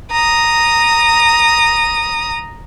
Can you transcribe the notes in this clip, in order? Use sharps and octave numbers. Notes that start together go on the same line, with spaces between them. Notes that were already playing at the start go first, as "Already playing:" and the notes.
A#5 D#6